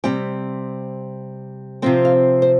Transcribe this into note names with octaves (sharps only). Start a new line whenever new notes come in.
C3 G3 C4 G5
C3 F3 C4 G5
F5
C5